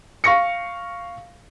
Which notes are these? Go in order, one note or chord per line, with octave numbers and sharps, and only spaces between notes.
F5 C#6 A#6 C#7